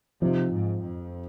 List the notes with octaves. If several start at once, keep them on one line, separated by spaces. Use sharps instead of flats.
C3 F3 C4 D#4
G#2
F2